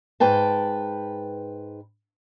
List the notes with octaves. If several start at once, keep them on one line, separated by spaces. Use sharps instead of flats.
G#2 B4 G5 A5